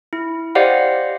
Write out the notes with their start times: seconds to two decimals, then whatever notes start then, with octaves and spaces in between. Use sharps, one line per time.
0.13 E4
0.55 G4 C5 D5 D#5 F5 F#5